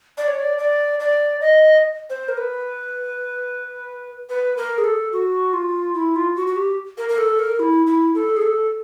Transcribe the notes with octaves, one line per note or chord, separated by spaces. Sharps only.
D5
C#5
D5
D5
D5
D#5
C5
A#4
B4
B4
A#4
G#4
A4
F#4
F4
E4
F4
F#4
F#4
G4
A#4
A#4
A4
A#4
E4
E4
A4
G#4
A4